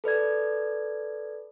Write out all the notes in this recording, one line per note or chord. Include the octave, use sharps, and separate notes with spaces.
A4 B4 D5 G#6